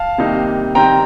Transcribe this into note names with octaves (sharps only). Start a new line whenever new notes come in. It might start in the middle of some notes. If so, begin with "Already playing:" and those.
Already playing: F5 A5
C3 D#3 G3 A#3 D#4
D#3 G3 C4 G5 A#5